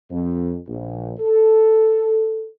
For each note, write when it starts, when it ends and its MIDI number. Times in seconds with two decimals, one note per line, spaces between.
0.11 0.57 41
0.67 1.13 34
1.19 2.48 69